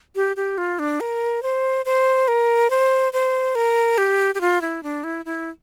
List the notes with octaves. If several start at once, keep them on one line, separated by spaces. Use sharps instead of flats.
G4
G4
F4
D4
A#4
C5
C5
A#4
C5
C5
A#4
G4
G4
F4
E4
D4
E4
E4